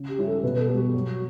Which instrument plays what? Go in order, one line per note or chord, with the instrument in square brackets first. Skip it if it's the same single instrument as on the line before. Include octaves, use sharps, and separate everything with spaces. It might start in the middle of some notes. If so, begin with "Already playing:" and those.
Already playing: [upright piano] C#3
[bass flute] G4
[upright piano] G3 C#4 E4
[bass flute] A4
[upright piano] B2 [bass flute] B4
[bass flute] A4
[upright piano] B3 [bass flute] G4
[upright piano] G3 [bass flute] F#4
[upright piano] F#3